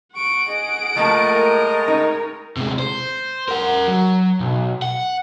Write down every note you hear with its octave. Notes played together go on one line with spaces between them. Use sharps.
F#5 C#6 D7
G#4 D#5
A2 F3 A3 A#3 D#5 A5
G#3 A#4
D#4 C#5
C3 G#3
C5
A#4 F#5
F#3
B1
F#5